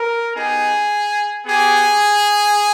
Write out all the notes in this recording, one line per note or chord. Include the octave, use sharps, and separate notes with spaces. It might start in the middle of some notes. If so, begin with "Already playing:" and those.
Already playing: A#4
B3 D#4 G4 G#4
B3 G4 G#4